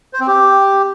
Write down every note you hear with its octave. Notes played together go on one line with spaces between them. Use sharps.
C5
C4
G4